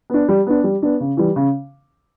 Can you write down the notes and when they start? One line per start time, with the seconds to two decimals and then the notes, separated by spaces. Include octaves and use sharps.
0.10 B3 D4
0.29 G3
0.47 B3 D4
0.64 G3
0.82 B3 D4
1.00 C#3
1.17 E3 G3
1.36 C#3